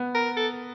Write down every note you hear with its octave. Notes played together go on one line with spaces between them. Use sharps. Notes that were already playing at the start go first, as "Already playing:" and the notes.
Already playing: B3
A#4
A4